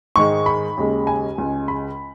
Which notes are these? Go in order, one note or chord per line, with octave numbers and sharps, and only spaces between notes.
G#2 D#3 G#3 C#6
B5
D#2 C#3 G#3
G#5
C#2 C#3 G#3
B5